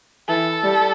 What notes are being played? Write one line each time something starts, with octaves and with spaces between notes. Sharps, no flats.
E3 A4
G3